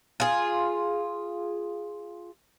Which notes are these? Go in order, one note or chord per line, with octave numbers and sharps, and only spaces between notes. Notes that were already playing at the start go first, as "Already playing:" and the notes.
F4 G#4